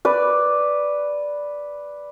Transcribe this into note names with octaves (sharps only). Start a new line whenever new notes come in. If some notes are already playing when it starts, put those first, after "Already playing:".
B4 D5